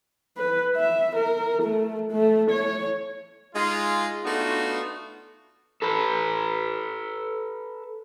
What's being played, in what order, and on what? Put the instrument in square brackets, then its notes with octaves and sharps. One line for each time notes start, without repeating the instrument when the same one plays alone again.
[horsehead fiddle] B4
E5
A#4
A3
A3
C#5
[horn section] G#3 D#4 F4
A3 B3 D4 D#4 F4 F#4
[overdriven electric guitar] A4 B4